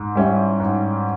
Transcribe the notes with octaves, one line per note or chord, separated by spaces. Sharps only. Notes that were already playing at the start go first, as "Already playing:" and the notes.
Already playing: G#2
G3 C#4 E4
G#2